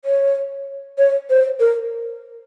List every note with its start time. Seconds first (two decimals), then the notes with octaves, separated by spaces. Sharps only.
0.05 C#5
0.98 C#5
1.30 C5
1.60 A#4